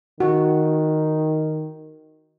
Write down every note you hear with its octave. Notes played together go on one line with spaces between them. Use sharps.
D#3 F#4